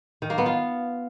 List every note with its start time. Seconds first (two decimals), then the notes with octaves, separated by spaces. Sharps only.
0.22 D#3
0.30 A#3
0.38 B3
0.46 F4